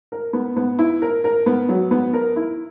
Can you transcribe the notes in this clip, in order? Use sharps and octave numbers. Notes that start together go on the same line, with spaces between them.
A#4
B3
B3
E4
A#4
A#4
B3
F#3
B3
A#4
E4